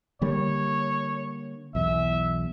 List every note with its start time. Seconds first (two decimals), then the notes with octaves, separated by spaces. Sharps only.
0.21 D3 G3 A#3 C#5
1.75 B1 E2 E5